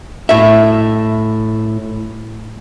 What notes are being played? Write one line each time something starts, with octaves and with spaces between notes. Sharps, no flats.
A2 E5